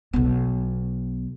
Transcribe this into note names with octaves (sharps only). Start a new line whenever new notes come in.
B1 B3